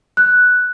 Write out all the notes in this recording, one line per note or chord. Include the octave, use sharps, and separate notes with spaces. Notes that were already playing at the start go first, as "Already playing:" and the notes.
F#6